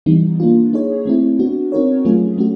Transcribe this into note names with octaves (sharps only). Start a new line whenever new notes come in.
E3 G3 B3 D#4
A#3 D4 F4
A#3 D#4 G#4 C#5
A3 C4 E4
B3 D4 F#4
C4 D#4 F#4 A#4 C#5
F#3 A3 C#4 F4 G#4
A3 C#4 F#4